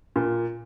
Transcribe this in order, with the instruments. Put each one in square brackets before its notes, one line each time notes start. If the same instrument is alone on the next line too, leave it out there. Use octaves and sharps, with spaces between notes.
[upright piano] A#2